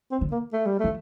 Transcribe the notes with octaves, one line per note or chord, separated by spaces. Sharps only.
C4
D3
A#3
A3
G3
F3 A3